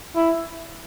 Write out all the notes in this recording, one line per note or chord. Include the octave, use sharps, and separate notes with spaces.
E4